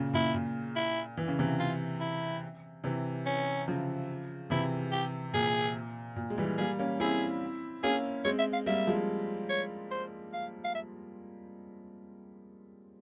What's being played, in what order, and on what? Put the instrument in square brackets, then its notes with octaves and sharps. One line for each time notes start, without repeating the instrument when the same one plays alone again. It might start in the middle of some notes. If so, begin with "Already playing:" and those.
Already playing: [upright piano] A#2 C#3
[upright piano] A#2 [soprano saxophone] E4
[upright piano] A#2
[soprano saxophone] E4
[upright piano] E3
C#3
C3 E3
[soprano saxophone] F4
E4
[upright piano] C3 E3
[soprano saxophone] C#4
[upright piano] C#3 F3
[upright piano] C3 E3 [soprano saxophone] E4
[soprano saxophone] G4
[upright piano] A#2 [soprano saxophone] G#4
[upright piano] A#2
G#3
E3 G3
[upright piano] G3 A#3 [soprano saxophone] G#4
[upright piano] A#3 C#4
[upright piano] C4 E4 [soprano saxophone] G#4
[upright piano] A#3 C#4 [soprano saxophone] G#4
[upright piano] G#3 C4 [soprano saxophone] C#5
[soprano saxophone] E5
F5
[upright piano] G3 A#3 [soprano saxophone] E5
[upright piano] F3 G#3
[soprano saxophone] C#5
C5
F5
F5
E5